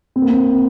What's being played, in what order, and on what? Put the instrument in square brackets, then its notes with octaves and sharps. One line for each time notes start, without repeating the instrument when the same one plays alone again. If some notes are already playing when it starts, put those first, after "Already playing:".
[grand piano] C4
A#3
C4